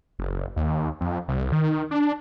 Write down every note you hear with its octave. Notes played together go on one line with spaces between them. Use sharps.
F#1
D#2
F2
C2
D#3
D4